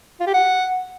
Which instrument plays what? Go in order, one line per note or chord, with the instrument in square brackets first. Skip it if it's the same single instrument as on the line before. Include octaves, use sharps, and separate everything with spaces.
[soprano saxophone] F4
G4
F#5